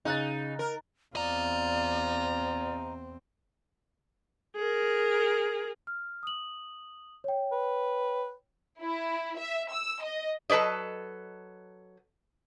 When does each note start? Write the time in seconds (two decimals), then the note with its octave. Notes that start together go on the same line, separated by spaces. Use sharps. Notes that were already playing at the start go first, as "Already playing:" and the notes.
0.05 C#3 D#4 F#6 A6
0.59 A#4
1.15 E2 C4 F4 D5 D#5 A#5
4.56 G#4 A#4
5.87 F6
6.23 D#6 F#7
7.24 C#5 G5
7.52 B4
8.81 E4
9.37 E5
9.72 E6
10.03 D#5
10.50 F#3 A4 B4 D5 D#5